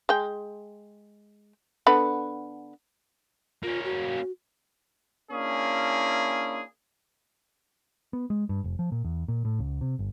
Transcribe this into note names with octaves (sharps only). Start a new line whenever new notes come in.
G#3 G5
D3 B3 B5
A#3 C#4 F4
F#4
A#3 C#4 D4 E4 G#4
B3
G#3
G2
F1
F3
A#2
E2
A#2
A2
C#2
C3
G1